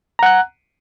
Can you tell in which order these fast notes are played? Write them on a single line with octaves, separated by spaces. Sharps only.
A#5 F#5 F#6